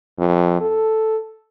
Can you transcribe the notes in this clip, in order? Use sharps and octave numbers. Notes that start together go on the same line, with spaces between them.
F2
A4